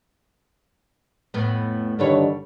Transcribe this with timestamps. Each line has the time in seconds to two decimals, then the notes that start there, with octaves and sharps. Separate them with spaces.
1.34 F2 A2 B3
1.99 G2 D3 D#3 G3 B4 C#5